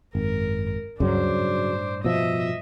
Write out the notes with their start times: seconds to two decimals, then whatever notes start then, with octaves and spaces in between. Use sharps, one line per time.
0.15 G#1 F#2 A#4
1.00 D2 G2 C#3 F#3 D4 C5
1.42 A2
2.04 B2 F3 D#5 E5